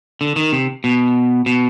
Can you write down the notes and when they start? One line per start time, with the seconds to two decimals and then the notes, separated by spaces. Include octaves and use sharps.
0.21 D3
0.36 D#3
0.52 C3
0.84 B2
1.46 B2